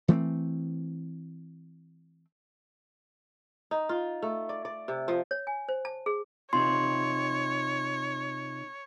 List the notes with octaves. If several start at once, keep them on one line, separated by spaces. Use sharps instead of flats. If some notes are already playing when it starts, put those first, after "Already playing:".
E3 A3 A#3 C4
D#4
F4
A3
D5
D5
C3
F3
C#5
G#5
C5
A5
G#4
C3 D#4 F4 C#5 C6